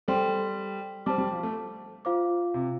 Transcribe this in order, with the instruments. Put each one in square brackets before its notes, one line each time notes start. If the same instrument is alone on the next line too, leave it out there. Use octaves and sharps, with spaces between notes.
[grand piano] G3 [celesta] A4 C5 G5 C6
[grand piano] G3 [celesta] C5 A5 D6
[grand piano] G3
F3
A3
[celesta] F4 C5 F5 D6
[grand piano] C3